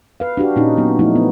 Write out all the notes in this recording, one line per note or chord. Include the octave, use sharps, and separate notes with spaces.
B4 F5
D4 F#4 G4
A#2 C#4 D#4
F#3 B3
F3 A3 D#4 E4
B3